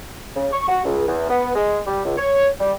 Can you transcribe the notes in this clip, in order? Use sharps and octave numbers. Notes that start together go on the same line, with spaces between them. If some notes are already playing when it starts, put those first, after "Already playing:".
C#3
C#6
F#4
C#2
E2
B3
G#3
G3
C#2
C#5
G3